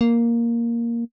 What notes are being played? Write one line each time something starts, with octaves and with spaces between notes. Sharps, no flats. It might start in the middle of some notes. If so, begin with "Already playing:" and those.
A#3